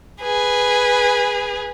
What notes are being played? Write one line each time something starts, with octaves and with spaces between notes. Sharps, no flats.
G#4 B4